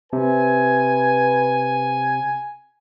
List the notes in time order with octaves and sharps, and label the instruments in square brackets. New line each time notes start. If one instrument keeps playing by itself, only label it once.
[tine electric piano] C3 [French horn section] B4 [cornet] G#5